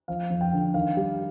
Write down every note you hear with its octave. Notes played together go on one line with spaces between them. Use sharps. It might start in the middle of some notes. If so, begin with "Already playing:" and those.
F3 F5
F2
G5
D3
D#3 F5
G3